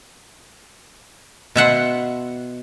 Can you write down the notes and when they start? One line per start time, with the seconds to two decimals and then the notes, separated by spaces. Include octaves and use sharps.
1.55 B2 E5 F#5 C6